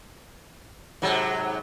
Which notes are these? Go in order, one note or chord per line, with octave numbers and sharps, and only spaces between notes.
G#2 C3 F#3